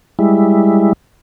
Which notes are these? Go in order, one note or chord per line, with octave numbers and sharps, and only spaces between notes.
G3 G#3 E4